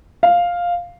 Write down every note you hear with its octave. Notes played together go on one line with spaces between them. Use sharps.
F5